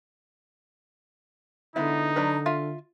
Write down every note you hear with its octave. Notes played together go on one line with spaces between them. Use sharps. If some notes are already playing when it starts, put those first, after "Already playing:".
D3 G#3 B3 D#4 E4
F#3 D4 B4
F4 E5 F5